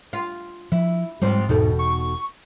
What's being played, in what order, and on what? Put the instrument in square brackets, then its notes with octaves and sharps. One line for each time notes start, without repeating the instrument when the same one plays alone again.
[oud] F4
[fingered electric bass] F3 [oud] E4
[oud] G#2 F3 C4 [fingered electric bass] G3 G#3
[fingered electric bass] E1 [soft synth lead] G#2 [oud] B2 D#4 A4
[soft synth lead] C#6